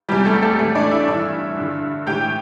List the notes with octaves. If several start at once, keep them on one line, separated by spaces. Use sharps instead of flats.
E2 C3 E3 G3 G4
A3 A4
A3 A4
A2 E3 A3 A4
D4 D5
E4 E5
G2 E3 E4 E5
G2 D3
A2 E3 G4 G5